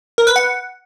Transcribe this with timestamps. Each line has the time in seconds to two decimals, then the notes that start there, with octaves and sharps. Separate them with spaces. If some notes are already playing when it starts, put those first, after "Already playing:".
0.18 A#4
0.27 B4
0.36 F#5